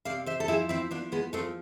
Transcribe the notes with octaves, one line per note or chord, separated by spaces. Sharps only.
C3 D5 F5
C5 E5
A4
F3 E4 G#4
C4 E4
F3 B3 D4
G#3 B3
F3 A3 C4